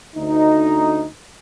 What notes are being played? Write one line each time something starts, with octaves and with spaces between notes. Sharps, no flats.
D2 D#4